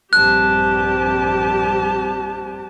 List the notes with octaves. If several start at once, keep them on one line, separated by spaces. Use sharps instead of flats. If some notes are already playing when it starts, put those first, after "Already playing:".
A#1 G2 C4 G4 A5 F#6